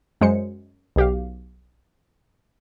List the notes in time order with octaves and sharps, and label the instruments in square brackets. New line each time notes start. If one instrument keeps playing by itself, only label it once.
[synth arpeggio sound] F#2 G#3 C5 C#7
B1 G4 F5